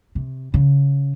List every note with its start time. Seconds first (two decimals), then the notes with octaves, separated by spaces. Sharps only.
0.15 C3
0.54 C#3